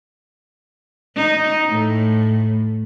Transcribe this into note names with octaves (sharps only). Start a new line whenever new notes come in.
D#4
A2